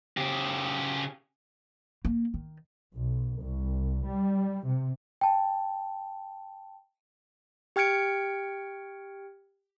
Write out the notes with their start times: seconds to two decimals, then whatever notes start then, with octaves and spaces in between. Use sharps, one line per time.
0.17 C#3 G4
2.05 A#3
2.34 D#3
2.95 B1
3.39 C2
4.06 G3
4.65 C3
5.21 G5 A5
7.76 G4 G5 F6 G#6 C#7 D7